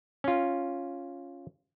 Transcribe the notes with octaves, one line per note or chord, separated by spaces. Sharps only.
C#4 F4